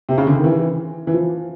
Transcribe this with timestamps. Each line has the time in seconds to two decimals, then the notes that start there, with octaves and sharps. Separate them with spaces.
0.09 C3
0.18 C#3
0.27 D3
0.35 D#3
0.44 E3
1.07 E3
1.14 F3